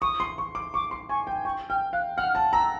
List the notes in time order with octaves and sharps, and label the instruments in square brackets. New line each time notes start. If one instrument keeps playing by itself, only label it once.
[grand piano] C#6 [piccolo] D#6
[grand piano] C6
C#6
D6
[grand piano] C#6 [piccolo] D6
[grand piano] C6
[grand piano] G#5 [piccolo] C#6
[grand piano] G5
[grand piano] G5 [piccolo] C#6
[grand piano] G5 [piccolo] F6
[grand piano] F5 [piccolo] F#6
[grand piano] F#5 [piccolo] F6
[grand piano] A5
[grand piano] A#5 [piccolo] E6